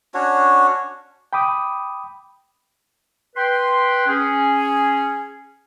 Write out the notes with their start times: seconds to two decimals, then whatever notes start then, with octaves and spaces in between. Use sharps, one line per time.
0.14 C#4 D4 F#4 C#5
1.33 G5 B5 D6 D#6
3.36 B4 G5 C6
4.07 C#4 G#4